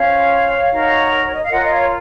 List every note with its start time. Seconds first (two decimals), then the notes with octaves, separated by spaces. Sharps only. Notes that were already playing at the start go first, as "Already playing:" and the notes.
Already playing: C#4 F4 C5 C#5 F5
0.70 D#4 F#4 A#4 C#5
1.25 C#5
1.33 D#5
1.42 F5
1.49 F4 A#4 C#5 D#5 F#5
1.64 D#5
1.70 C#5 F5